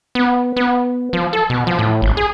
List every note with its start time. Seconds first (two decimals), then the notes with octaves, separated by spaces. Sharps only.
0.15 B3
0.57 B3
1.13 F3
1.33 A4
1.50 B2
1.67 F3
1.79 A2
2.02 G#1
2.17 G#4